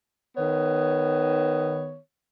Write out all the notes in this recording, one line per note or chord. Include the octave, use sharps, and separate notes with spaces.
D#3 B3 C#5